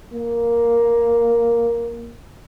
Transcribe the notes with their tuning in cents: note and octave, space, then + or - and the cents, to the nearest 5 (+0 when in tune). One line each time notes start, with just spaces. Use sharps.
A#3 +5